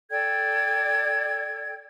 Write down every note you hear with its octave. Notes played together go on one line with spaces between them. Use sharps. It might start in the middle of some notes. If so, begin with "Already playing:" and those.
A4 D5 G5 G#6